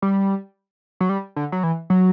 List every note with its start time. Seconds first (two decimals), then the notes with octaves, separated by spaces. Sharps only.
0.02 G3
1.01 F#3
1.09 G3
1.36 D3
1.52 F#3
1.63 E3
1.90 F#3